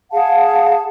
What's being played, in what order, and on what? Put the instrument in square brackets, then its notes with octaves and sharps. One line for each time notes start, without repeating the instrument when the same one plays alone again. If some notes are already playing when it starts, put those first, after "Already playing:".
[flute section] G#4 F5 F#5 A5